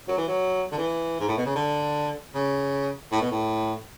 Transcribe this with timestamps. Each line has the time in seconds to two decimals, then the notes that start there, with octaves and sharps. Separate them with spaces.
0.08 F#3
0.18 E3
0.28 F#3
0.72 D3
0.78 E3
1.20 G#2
1.29 A2
1.37 B2
1.46 C#3
1.55 D3
2.34 C#3
3.12 A2
3.22 B2
3.31 A2